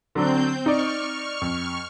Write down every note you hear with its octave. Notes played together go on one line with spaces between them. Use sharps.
D3 F#3 C4 D4 G6
D#4 D5 C#6 F6
F2